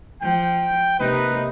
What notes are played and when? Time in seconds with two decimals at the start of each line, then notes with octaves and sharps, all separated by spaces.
0.21 F3 G5
0.99 C3 A#3 D#4 B4